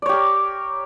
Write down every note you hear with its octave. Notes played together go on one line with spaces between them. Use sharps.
G4 A#4 C#5 D5